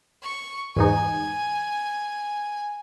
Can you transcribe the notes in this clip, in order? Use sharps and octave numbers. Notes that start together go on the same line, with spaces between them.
C#6
E2 G#2 D#4 G#5